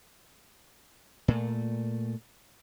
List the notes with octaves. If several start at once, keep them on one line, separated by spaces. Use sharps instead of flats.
A#2 A3